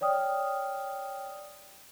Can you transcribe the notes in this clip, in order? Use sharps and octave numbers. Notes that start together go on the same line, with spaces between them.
C#5 D5 G5 D#6 F6